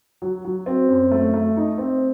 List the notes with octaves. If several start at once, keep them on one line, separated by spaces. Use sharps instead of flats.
F#3
F#3
C4
F#2
A3
A3
D#4
C4